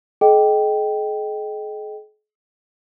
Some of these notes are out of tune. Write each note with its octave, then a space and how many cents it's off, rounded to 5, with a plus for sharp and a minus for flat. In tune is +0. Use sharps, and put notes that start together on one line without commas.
G#4 +45 D#5 +0 G5 -5